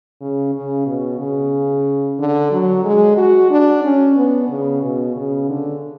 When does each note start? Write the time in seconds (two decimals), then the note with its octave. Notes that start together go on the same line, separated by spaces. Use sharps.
0.21 C#3
0.54 C#3
0.86 B2
1.20 C#3
2.19 D3
2.51 F#3
2.85 G#3
3.18 F#4
3.51 D4
3.84 C#4
4.16 B3
4.49 C#3
4.83 B2
5.16 C#3
5.50 D3